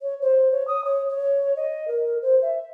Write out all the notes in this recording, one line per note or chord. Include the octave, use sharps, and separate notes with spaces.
C#5
C5
C#5
D#6
C#5
C#5
D#5
A#4
C5
E5